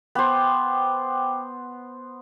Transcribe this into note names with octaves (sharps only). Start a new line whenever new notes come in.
B3 C5 G5 D6